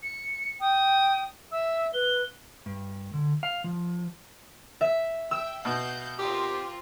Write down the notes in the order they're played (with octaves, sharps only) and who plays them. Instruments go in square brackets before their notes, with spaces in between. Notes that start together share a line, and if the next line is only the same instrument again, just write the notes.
[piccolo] C#7
[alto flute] G5 [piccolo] D#6
[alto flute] E5 [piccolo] E6
[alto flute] B4 [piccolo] G7
[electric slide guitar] G2
D3
F5
F3
[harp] E5
[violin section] E5 G5 [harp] E6
[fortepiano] B2 [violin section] F5 F#5 G6
[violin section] C4 F4 A#4 [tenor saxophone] G4